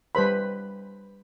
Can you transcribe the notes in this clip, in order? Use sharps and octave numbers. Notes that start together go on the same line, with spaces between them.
G3 B4 C5 B5